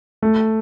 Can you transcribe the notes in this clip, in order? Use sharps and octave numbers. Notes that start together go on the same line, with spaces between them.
A3